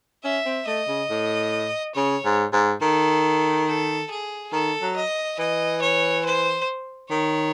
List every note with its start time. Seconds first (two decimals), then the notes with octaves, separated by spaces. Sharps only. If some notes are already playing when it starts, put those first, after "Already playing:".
0.24 C#4 E5
0.46 C4
0.67 A3 D#5
0.88 C#3
1.10 A2
1.95 C#3 C#5
2.25 G#2
2.53 G#2
2.81 D#3 A4
3.67 A4
4.11 G#4
4.52 D#3 A4
4.82 F#3
4.96 D#5
5.39 E3 D#5
5.82 C#5
6.25 C5
7.10 D#3 C#5